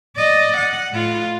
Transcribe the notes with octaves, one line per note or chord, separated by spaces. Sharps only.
D5 D#5
F#5
A2 F4